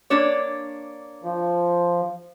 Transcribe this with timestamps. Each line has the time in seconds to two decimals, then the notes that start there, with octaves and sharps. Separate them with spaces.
0.10 A#3 D4 C#5
1.23 F3